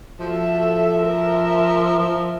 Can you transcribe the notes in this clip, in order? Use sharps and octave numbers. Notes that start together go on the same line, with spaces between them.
F3 F#4 A4 E5
A#4 E5
F3